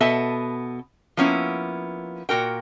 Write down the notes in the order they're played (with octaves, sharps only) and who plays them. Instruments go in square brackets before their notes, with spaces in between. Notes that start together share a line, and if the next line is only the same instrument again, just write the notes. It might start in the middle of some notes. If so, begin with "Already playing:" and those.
[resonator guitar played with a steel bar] B2 B3 A4 E5 A5
F3 A#3 B3 C#4 E4
A#2 F#4 A#4 G5